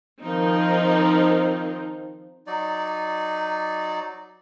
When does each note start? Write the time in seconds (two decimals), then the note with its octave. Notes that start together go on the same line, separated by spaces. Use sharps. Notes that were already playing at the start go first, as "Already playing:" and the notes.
0.22 D#3 F3 C4 D#4
2.47 F#3 D#4 D5